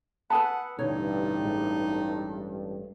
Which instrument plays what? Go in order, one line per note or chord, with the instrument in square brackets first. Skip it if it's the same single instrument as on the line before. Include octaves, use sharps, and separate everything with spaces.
[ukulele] B4 G#5 A5 [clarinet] F#5 [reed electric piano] B5 D#6 E6
[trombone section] A1 G2 [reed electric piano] B2 D3 [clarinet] D#4 [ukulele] C#5
[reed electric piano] A2 G#3